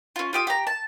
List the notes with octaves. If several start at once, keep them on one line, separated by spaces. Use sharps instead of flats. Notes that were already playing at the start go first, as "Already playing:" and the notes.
C#4 F4
F4 G4 D#6
G4 A#5
A5